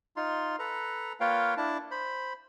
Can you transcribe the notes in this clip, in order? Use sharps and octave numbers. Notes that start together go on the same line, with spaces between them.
D#4 F4 C6
A4 B4 A#5
A#3 F4 B4 C#5 F5 G5
D4 E4 A5
C5 B5